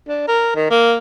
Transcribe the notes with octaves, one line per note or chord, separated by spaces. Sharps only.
D4
A#4
D#3
A#3